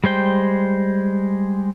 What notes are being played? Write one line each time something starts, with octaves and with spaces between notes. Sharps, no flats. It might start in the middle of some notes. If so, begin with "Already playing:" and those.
G3 G#3 C5 G5